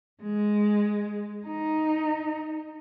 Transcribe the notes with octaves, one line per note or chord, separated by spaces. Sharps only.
G#3
D#4